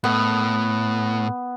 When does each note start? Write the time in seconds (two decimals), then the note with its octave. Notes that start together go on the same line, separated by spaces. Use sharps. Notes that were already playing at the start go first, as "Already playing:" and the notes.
0.04 A2 B3